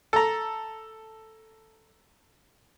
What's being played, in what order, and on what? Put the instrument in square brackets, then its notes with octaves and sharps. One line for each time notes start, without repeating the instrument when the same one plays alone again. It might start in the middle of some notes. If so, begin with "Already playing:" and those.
[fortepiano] A4 A#5